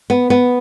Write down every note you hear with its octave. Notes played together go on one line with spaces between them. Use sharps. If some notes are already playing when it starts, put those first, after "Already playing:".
B3
B3